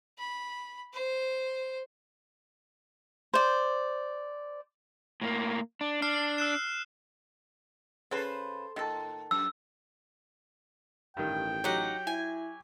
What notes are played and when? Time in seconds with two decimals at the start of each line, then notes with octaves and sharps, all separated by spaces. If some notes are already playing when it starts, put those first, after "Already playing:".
0.18 B5
0.93 C5
3.34 C5 D5
5.21 A2 A#3
5.81 D4
6.02 D4 F6 C7
6.38 E6 F#6 E7
8.11 C#3 A4 B4 C5
8.76 A2 D#3 A4
9.31 F#2 E6
11.17 A1 G2 D#3 G5
11.64 F#3 D#4 G4 F#5
12.07 E4 G#5